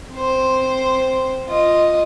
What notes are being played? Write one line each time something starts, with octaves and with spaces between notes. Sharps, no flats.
C4 C5
F4 D#5